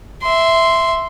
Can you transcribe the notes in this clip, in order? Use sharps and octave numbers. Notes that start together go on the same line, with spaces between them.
E5 C6